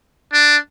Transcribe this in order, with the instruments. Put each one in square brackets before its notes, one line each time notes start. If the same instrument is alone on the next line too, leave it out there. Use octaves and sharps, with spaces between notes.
[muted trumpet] D4